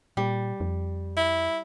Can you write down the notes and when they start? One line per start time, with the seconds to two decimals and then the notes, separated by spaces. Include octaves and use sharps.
0.17 A#2 G3
0.60 F2
1.17 E4